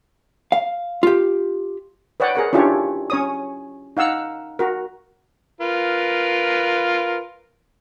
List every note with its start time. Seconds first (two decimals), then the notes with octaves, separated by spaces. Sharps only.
0.52 F5
1.03 F4 G4
2.20 B4 C#5 D5 F#5 G5
2.35 G#4 A#4 F#5
2.53 C#4 D4 E4 F4 G4 C#5
3.10 C#4 C#5 D#6
3.97 D#4 F5 F#5 E6
4.59 F#4 A#4
5.61 F4 A#4 B4